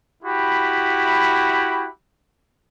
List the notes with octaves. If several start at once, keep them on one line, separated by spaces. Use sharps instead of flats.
E4 F#4 G4 B5